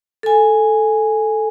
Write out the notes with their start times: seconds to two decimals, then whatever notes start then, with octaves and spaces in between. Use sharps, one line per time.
0.23 A4 G#5